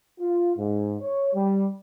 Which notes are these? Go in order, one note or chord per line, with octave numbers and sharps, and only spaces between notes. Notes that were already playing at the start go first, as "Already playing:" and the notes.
F4
G#2
C#5
G3